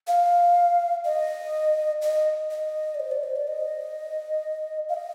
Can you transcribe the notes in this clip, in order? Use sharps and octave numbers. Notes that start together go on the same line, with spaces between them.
F5
D#5
D#5
D#5
D5
C5
D5
C5
D5
D#5
F5
D#5